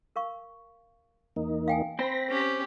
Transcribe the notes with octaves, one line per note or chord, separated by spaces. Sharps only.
A#4 F5 C#6
E2 A#3 D#4
F5 G5 G#5
C4 C5 B5 A#6
C#4 G4